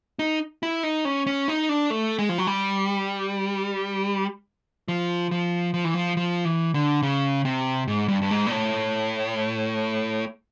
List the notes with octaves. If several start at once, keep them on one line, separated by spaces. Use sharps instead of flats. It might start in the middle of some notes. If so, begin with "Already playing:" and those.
D#4
E4
D#4
C#4
C#4
D#4
D4
A3
G#3
F3
F#3
G3
F3
F3
F3
E3
F3
F3
E3
D3
C#3
C3
G#2
G2
G2
G#2
A#2
A2